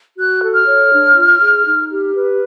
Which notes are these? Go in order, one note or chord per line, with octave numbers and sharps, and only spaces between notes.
F#4 F#6
A4
F6
C#5
D4
F4
G#4
D#4
G4
B4